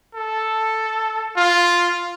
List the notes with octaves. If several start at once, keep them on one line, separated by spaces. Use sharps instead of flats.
A4
F4